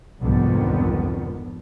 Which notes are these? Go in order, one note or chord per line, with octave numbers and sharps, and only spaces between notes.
C2 F2 G#2 D3 D#3 B3